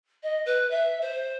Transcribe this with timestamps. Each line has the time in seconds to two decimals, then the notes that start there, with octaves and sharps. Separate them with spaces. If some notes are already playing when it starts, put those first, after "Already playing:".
0.23 D#5
0.46 B4
0.70 E5
1.01 C5